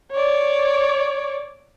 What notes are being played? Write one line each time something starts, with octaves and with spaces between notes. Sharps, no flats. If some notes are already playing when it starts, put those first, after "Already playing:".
C#5 D5